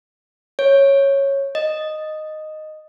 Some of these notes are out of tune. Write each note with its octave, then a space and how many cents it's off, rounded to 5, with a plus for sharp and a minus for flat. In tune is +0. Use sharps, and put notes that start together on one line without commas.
C#5 -10
D#5 -5